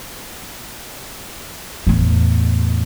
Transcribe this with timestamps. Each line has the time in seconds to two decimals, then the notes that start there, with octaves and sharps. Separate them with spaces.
1.87 E2 A2